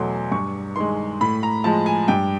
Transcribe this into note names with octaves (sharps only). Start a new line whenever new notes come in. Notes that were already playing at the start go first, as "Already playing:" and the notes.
Already playing: E2 B2 F#3 A3 C6
G2 C#6
D#3 G#3 C6
A2 B5
A#5
F3 G#3 A5
G#5
G2 G5